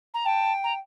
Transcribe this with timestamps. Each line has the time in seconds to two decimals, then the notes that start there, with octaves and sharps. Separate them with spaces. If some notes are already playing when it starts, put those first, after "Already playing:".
0.14 A#5
0.25 G5 A5
0.63 A#5